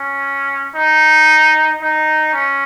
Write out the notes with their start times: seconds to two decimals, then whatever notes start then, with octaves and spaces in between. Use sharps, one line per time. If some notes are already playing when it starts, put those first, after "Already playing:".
Already playing: C#4
0.75 D#4
1.82 D#4
2.34 C#4